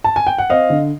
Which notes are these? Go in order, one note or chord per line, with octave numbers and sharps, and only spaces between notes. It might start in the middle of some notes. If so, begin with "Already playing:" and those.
A5
G#5
G5
F#5
C4 D#5 F5
D3